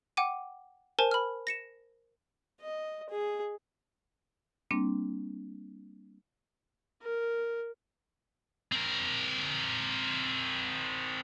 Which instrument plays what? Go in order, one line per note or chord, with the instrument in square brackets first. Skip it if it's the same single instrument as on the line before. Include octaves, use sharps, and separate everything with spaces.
[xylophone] F#5 G5 D6 D#7
A#4 C5 G#5 A5
B5 F6
A#6 C#7 E7
[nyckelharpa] D#5
G#4
[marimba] G3 A#3 C4 D4
[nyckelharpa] A#4
[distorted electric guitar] C4 A#4